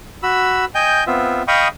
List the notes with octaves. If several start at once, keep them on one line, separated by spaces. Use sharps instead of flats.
F#4 B5 E6
D#5 G5 G#5 G6
B3 C4 F4 E5
D#5 F5 G5 B5 C#6 D#6